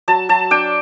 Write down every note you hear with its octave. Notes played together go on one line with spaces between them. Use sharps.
F#3 A5
F#3 A5
D4 G5